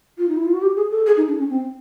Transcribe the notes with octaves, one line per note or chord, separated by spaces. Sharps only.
F4
D#4
E4
F4
F#4
G4
G#4
A4
G#4
D#4
D4
C#4
C4